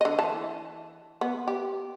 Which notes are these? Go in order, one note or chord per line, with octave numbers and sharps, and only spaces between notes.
D3 D#5
E3 A5
B3
G4